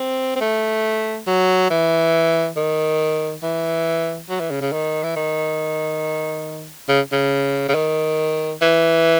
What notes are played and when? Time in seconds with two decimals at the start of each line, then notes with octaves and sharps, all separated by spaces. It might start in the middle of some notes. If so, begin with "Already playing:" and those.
Already playing: C4
0.36 C4
0.41 A3
1.27 F#3
1.70 E3
2.56 D#3
3.43 E3
4.30 F#3
4.40 E3
4.51 C#3
4.61 C#3
4.72 D#3
5.03 E3
5.16 D#3
6.89 C#3
7.12 C#3
7.69 C#3
7.75 D#3
8.62 E3